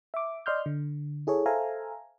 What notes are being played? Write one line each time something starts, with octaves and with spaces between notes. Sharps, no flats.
E5 D6
D5 D#5 C6 F6 G6
D3
E4 G#4 A4 C#5
A4 C5 E5 F5 G#5 A#5